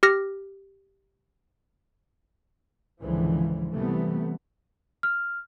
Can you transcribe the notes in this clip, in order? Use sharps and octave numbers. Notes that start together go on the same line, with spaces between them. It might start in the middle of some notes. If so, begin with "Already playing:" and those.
G4 F6 A#6
C#2 G#2 D3 E3 F3
C3 E3 G3 A3 B3
F6